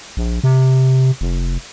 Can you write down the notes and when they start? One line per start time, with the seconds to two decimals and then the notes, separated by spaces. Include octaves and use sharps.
0.17 A#1
0.44 C3
1.21 F1